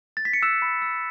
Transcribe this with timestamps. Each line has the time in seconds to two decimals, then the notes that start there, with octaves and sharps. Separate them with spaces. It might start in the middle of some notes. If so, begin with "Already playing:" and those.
0.17 A6
0.25 B6
0.33 C#7
0.42 E6 F#6 E7
0.62 B5
0.82 E6